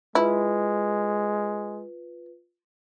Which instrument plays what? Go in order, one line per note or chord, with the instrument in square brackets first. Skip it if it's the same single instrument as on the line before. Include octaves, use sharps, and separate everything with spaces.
[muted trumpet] G#3 [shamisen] E4 [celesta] F4 B4